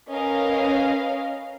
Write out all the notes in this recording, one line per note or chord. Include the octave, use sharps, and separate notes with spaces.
C#4 A#4 B4 D#5 F5